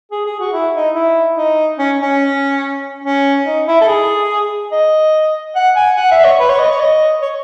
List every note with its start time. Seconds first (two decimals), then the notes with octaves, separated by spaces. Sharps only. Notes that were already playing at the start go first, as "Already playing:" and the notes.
0.12 G#4
0.26 G#4
0.40 F#4
0.53 E4
0.74 D#4
0.95 E4
1.36 D#4
1.79 C#4
2.02 C#4
3.04 C#4
3.46 D#4
3.68 E4
3.81 A4
3.88 G#4
4.72 D#5
5.56 F#5
5.76 G#5
5.97 F#5
6.11 E5
6.24 C#5
6.39 B4
6.49 C#5
6.59 D#5
6.71 C#5
6.80 D#5
7.22 C#5